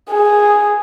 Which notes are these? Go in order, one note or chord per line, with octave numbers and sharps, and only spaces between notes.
G#4